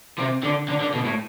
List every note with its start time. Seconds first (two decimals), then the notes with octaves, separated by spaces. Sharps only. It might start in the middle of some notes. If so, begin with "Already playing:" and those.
0.19 C3
0.43 D3
0.68 D3
0.81 D3
0.94 B2
1.05 A2